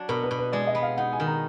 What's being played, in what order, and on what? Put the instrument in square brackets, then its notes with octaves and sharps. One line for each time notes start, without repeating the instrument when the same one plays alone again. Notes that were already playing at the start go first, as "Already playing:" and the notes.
Already playing: [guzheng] F#3 D4
[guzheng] B2 [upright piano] A#4
[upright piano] B4
[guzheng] B2
[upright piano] B4
[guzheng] G#3 [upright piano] D5
[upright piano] D#5
[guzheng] B3
[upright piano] F5
[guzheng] D#4 [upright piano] F#5
[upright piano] G#5
[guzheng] D#3
[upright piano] A#5